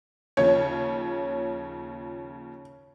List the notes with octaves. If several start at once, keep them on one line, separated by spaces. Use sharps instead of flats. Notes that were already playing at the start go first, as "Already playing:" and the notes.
D#2 C#3 F3 C#5